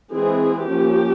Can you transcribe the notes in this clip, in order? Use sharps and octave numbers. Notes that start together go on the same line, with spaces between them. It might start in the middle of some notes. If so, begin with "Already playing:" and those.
E3 G#3 C4 G#4
F3 A#3 C#4 G4